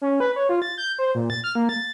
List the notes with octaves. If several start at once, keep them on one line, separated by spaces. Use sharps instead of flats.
C#4
B4
C#5
F4
A6
G6
C5
A#2
A6
F6
A#3
A6